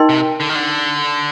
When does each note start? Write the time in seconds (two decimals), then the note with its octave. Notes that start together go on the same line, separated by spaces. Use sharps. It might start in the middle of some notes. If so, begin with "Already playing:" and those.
Already playing: D#4 A#4 D#5 G5 C6
0.09 C3
0.40 D3
0.50 D#3
0.55 D3